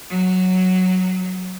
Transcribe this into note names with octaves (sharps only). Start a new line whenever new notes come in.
F#3